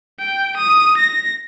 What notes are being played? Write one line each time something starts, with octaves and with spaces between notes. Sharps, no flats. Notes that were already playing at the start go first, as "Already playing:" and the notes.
G5
D#6
A#6